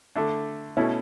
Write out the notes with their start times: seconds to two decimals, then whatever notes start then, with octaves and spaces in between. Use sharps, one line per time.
0.15 D3 A3 D4
0.77 B2 A3 C#4 E4